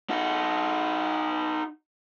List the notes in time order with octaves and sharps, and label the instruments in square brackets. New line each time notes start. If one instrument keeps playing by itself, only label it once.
[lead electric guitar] D#4 F#4